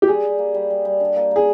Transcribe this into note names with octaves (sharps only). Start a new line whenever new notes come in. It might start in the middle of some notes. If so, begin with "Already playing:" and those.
G4
G3 G#4
G3
A#3
G3
G3
G3
D4
A#3
A#3 G#4